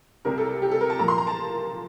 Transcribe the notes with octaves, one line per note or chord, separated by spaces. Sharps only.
C2 C3 G3 C4 A#4
A4
G4
A4
A#4
A5
A#2 F3 A#3 A#5
C6
A#5
A5